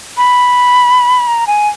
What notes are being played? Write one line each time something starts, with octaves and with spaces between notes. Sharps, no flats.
B5
A#5
G#5